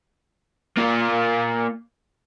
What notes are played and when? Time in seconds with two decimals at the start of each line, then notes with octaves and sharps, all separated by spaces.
0.78 A#3 F4